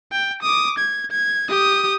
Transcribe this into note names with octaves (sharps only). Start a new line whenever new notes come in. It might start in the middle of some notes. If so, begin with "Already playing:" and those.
G5
D6 D#6
G#6
G#6
G4 D#6